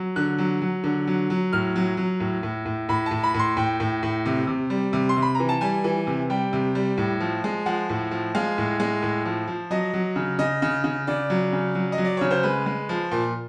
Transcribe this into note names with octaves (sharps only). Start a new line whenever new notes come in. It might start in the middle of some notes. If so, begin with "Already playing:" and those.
Already playing: F#3
D3 F#6
F#3
F#3
D3
F#3
F#3
A2 F6
F#3
F#3
A2
A2
A2
A2 B5
A2 A5
B5
A2
C6
A2 G5
A2
A2
C3
C3
G3
C3
C6
C3
B5
E3 A#5
A5
G3 G#5
E3
C3
G3 G5
C3
G3
A2
F3
G#3
F3 F#5
A2
F3
G#3 F5
A2
G#3
A2
F3
F3
F#3 D#5
F#3
C#3
C#3 D#5
C#3
C#3
C#3 D5
F#3
C#3
F#3
D#5
F#3
D5
C#3 C#5
C5
G#3 B4
G#3
F3
A#2